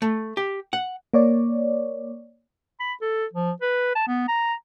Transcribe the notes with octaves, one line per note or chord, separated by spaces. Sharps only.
A3
G4
F#5
A#3 C#5 D5
B5
A4
F3
B4
A5
B3
A#5